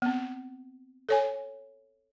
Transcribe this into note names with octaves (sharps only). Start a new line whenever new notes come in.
B3 C4
A4 C#5 G#5